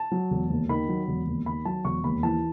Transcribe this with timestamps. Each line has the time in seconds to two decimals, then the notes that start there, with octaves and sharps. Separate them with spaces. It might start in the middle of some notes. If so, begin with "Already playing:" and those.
Already playing: A5
0.11 F#3
0.31 E1
0.50 D#2
0.69 D#3 B5
0.89 F#3
1.08 E1
1.27 D#2
1.46 D#3 B5
1.65 F#3 A5
1.85 E1 C#6
2.04 D#2 B5
2.23 E3 A5